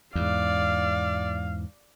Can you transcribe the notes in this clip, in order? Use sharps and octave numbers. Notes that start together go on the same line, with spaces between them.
E2 G#2 D5 F5